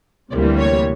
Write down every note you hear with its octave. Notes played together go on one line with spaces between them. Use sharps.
D2 C3 E3 G3 A#3 D5
C#5